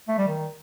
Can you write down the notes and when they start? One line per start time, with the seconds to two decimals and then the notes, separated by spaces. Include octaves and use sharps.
0.08 A3
0.18 G3
0.28 D#3